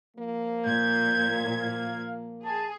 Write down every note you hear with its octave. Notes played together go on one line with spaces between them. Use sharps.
F3 A#3
A#2 G6 G#6
F5
G#4 A5